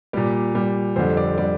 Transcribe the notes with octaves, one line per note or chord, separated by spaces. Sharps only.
A#2 G3 D5
A#2 G3
F2 D3 G3 C5
D5
D3 G3 D5